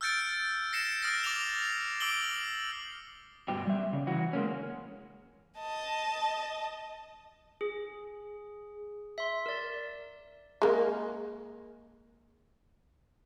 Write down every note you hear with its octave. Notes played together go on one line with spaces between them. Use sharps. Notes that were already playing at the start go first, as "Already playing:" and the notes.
E6 F6 G6 A6 C#7 D7
A#6 C7 C#7 E7
D#6 F6 A6 A#6 D7
D6 A6 F7 G7
C7
D6 E6 D7 F#7 G7
G2 B2 G3 G4
G3 E5
C#3
E3 F#4
G#3 A#3 C#4
D#5 A5
G#4
E5 C6
A#4 D5
G#3 A#3